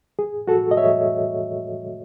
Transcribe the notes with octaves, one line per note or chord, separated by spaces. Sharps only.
G#4
F#4 A4
D#5
C#5 E5